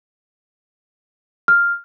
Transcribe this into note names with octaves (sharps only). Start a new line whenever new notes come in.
F6